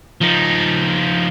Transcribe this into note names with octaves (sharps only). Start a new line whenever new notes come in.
F3 D#4